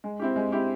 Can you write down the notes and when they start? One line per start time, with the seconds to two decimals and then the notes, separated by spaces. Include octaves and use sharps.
0.04 G#3
0.20 C4 E4 G4
0.36 G#3
0.52 C4 E4 G4